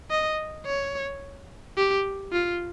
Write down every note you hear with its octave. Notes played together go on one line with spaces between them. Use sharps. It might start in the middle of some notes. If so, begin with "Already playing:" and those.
D#5
C#5
G4
F4